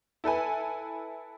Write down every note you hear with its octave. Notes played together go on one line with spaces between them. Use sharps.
E4 A4 B4 G#5